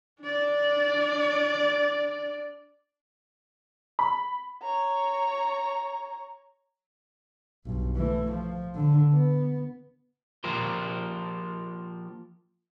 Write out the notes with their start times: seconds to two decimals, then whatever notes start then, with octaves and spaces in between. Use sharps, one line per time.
0.21 D4 D5
3.99 B5
4.62 C#5 A#5
7.66 B1 G2
7.96 E3 A3
8.32 F3
8.76 D3
9.13 B3
10.44 F3 A#3 F4 G4 A#4 C5